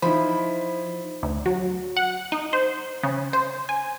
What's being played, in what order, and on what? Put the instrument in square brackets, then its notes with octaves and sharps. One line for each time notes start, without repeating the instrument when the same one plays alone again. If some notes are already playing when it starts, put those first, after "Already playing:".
[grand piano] F3 E4 [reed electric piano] D#4 C5 [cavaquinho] B5
[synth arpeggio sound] D2
F#3
F#5
D#4
C5
C#3
C5
G#5